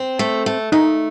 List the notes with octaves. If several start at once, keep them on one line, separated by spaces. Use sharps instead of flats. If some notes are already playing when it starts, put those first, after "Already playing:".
Already playing: C4
A3
A3
A3 D#4